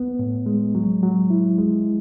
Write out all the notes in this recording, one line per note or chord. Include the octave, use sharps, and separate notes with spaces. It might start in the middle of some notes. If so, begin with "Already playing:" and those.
Already playing: B3
A2
G#3
F#3
F#3
E4
G#3